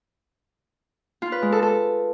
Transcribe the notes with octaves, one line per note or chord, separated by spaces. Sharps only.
F4
B4
G#3
A4
A4